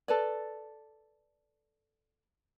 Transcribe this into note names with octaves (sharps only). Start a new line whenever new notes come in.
A4 B4 D5